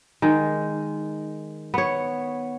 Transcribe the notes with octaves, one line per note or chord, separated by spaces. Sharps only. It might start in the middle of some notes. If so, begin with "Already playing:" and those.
D#3 G#3
B3 C#5